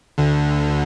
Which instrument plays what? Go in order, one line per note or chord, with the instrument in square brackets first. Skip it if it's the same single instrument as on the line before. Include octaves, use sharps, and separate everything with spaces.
[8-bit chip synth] D2 D3